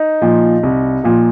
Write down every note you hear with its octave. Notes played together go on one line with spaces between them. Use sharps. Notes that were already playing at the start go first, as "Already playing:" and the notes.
Already playing: D#4
A#2 F3
C2
A#2 F3